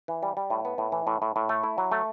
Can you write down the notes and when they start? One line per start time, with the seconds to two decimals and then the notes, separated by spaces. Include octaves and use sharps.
0.08 E3
0.23 G3
0.37 G3
0.50 A2
0.65 B3
0.78 A2
0.92 E3
1.07 A2
1.22 A2
1.36 A2
1.49 A3
1.63 E4
1.78 F#3
1.92 A3